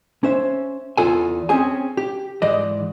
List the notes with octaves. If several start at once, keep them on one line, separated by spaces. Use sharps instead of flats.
C#4 C5 E5
E2 F4 A4 G#5
C4 C#4 G#4 G#5
G4
G#2 E3 D5 D#5